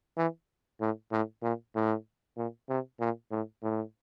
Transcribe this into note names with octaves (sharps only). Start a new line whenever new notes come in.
E3
A2
A2
A#2
A2
A#2
C3
A#2
A2
A2